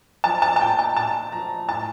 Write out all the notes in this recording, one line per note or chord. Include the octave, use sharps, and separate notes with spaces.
F3 A5
A5
A5
A#2 G5
A5
A#2 A5
F3 A#5
A2 A5